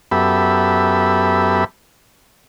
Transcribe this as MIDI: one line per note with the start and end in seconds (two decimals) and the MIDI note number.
0.11 1.64 42
0.11 1.64 59
0.11 1.64 67
0.11 1.64 69
0.11 1.64 76
0.11 1.64 83